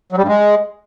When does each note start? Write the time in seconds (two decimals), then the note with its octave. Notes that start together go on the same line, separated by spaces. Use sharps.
0.12 F#3
0.18 G3
0.23 G2
0.28 G#3